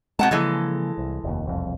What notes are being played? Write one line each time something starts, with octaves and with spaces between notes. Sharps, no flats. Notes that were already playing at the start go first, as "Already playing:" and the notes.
B2 G#3 C4 F#5 A5
C#3 E3 F3 G#3 A#3 A4
C2
F1 D#2
E1 C2 F2